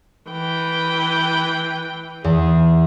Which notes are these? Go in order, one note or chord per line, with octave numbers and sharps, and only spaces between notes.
E3 G5
E2 G#4